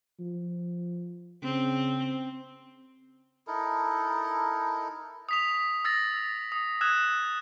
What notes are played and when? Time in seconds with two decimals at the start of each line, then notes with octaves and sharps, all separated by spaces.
0.19 F3
1.43 C#3 C4
3.47 D#4 E4 A4 A#4
5.29 D#6 B6 F7
5.85 E6 A6 A#6
6.52 D#6
6.81 D#6 E6 F#6 G#6 E7